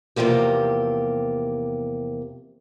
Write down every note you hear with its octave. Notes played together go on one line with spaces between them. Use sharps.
E2 C3 F3 A#3 G4